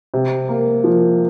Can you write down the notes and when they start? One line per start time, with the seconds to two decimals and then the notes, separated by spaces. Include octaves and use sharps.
0.14 C3
0.49 A#3
0.84 F3